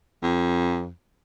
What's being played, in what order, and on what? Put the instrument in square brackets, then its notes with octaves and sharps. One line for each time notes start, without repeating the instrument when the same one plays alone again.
[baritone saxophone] F2